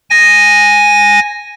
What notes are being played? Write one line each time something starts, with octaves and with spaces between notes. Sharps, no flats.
G#5 A#6